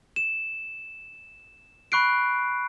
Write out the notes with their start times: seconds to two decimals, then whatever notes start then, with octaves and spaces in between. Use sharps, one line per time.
0.16 E7
1.92 B5 C#6 F#6 C7 D7